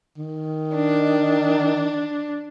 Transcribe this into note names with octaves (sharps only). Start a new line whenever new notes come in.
D#3
D4